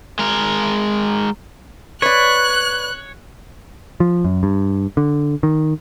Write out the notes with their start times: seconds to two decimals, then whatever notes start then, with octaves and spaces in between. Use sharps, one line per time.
0.19 G#3 A#4
2.02 B4 C#5 D5 F#6
4.00 F3
4.24 F#2
4.43 G2
4.97 D3
5.43 D#3